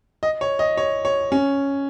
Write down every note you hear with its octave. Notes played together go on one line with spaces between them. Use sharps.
D#5
C#5
D#5
C#5
C#5
C#4